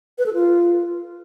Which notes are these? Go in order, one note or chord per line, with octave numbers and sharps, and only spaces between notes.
B4
A4
F4